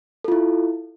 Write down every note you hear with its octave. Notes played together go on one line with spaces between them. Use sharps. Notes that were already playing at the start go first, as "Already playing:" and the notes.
E4 F4 A4